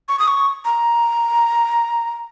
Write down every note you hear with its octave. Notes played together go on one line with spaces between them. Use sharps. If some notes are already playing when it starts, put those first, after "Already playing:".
C#6
D#6
C#6
A#5